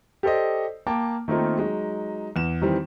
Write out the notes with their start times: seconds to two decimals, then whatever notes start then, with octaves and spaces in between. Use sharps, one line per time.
0.23 G4 A4 C5 D5 D#5
0.87 A#3 G5 A5 D6
1.28 D#3 A3 A#3 C4 D#4 F4
1.57 F#3 G#3 D#4
2.36 E2 E7
2.61 D#3 E3 G3 C4